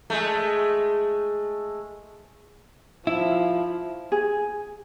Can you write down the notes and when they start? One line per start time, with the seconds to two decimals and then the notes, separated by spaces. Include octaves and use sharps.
0.10 G#3 A3
3.07 F3 E4
4.12 G#4